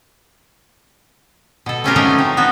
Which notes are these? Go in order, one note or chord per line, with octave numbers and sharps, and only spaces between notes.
B2 A4
A3 C4 C#4 F4 G4 A#4
F3 F#3 A3 C#4 D#4 E4
C4
B3 C#4 F#4 A4